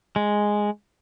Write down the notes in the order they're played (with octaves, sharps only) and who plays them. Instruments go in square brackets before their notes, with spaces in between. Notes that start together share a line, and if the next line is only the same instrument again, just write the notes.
[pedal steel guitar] G#3